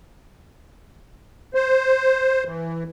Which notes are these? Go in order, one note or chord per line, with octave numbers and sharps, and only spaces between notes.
C5
E3